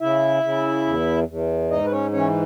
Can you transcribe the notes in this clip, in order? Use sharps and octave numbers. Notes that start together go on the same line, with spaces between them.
C#3 E4 E5
C#3
E2
E2
G#2 D#4 D#5
B4
C#4 C#5
E3 C#4 C#5